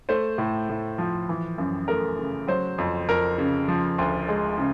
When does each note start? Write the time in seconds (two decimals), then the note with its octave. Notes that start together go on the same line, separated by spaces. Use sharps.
0.09 A3 C5
0.38 A2
0.69 A2
0.98 F3
1.29 E3
1.58 F#2
1.88 A3 A#4
2.19 C#3
2.48 F#3 C5
2.78 F2
3.08 F2 A#4
3.38 C#3
3.68 F3
3.98 D2
4.28 G#3
4.58 C#3